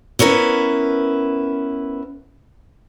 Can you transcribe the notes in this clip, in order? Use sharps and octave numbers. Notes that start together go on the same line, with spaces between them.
B3 C#4 E4 A#4 B4